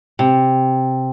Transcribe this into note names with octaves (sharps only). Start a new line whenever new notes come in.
C3